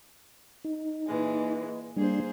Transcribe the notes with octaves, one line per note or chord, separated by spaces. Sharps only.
D#4
A#2 E3 G#3
G3 A#3 D4 G#4 C5